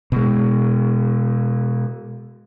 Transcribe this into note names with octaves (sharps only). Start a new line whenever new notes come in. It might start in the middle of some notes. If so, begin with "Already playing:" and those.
B2 G#3